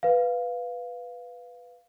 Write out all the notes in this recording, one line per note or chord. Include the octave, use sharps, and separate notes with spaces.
B4 F5